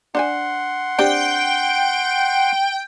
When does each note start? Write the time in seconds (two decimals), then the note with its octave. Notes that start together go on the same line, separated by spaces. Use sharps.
0.15 D4 C5 F#5 G#5 C6
0.98 C4 D4 G4 G5